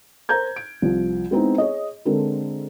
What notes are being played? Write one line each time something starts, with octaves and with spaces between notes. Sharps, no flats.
A#4 C5 A#5 G6 G#6
D7
C2 F3
G#3 B3 C4 D#4 E4
G#4 C#5 D#5
D3 G#3 C4 A4 A#4